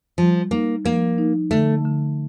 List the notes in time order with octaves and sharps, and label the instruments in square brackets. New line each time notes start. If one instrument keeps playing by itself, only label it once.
[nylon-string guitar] F3 [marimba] G3
[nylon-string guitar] A#3 [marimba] D#4
[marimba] F3 [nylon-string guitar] A#3
[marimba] D#4
[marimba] D3 [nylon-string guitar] A3
[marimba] D3